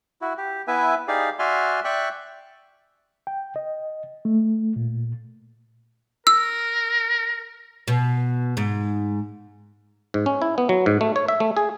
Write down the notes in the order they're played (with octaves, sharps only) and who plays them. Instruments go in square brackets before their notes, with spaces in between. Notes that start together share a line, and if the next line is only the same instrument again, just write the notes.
[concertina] E4 F#4
G4
B3 E4 B4 E5 G#5
D#4 G4 G#4 D5 F5
F#4 D5 E5 G#5 C6 F6
D5 E5 G5 C#6 F#6
[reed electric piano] G5
D#5
A3
A#2
[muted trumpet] A#4 [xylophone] E6
[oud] B2
G#2
[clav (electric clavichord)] G#2
C#4
E4
B3
F#3
G#2
A3
C#5
E5
A3
G#4